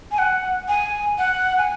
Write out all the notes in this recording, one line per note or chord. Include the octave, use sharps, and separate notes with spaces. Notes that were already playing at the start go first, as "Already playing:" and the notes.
G#5
F#5
G#5
F#5
G#5